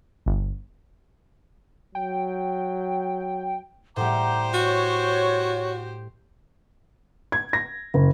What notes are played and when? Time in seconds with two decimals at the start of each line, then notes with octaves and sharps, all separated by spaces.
0.26 G1
1.95 F#3 G5
3.96 A2 G3 G4 C5 F#5 A#5 D6
4.54 F#4 C#5 C#6
7.32 G#6
7.53 A#6
7.94 F#1